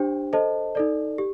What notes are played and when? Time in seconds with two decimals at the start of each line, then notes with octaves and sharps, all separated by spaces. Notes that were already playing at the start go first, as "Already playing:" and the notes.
Already playing: D4 G4 C5 G5
0.33 A4 C5 D#5 A5
0.75 D#4 A4 D5
1.18 G4